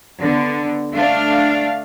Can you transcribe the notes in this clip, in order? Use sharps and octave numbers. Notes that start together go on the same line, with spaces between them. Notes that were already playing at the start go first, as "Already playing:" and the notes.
D3 B3
A3 D4 F5